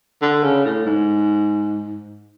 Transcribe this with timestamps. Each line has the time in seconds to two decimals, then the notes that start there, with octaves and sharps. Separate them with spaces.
0.22 D3
0.43 C#3
0.65 A2
0.86 G#2